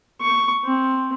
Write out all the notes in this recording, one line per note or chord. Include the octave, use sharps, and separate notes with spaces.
C#6
C4